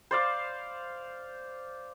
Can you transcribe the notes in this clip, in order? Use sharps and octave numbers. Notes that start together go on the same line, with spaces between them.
C5 D5 F5